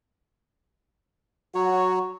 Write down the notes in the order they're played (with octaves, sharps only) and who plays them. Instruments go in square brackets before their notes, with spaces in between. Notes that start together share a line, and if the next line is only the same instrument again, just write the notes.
[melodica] F#3 C#5 [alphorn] F#4